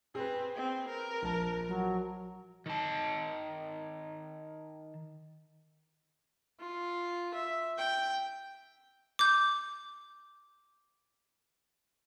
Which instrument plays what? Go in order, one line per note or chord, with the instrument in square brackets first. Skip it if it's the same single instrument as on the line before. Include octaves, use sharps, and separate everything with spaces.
[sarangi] C4 [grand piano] G#4 B4
[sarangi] C4
A#4
[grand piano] A#1 A5
[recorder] F#3
[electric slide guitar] D#3 A5
[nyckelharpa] F4
E5
G5
[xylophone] D6 G6